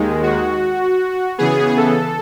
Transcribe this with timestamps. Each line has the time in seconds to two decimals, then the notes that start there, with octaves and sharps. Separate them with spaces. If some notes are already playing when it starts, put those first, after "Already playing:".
Already playing: D#2 D#3 G#3
0.23 F#4
1.38 C#3 E3 B3 G#4
1.77 A4